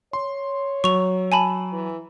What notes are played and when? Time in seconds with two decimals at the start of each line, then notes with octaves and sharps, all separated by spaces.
0.13 C#5 C6
0.84 F#3 C#6 F7
1.32 G#5 A5 B5
1.72 E3